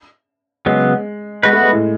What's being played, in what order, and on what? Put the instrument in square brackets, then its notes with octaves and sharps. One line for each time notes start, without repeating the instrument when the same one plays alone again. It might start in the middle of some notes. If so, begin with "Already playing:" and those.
[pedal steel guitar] C#3 F#3 B3 [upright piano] G#3
[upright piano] G#3 [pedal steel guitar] B3 F#4 B4
[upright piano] A3
G#3
A2